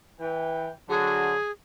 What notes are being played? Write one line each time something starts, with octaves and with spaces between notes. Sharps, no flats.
E3 G5
D3 F#3 F#4 G#4